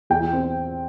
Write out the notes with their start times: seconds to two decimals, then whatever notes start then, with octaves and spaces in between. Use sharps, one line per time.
0.10 E2 G5
0.33 C4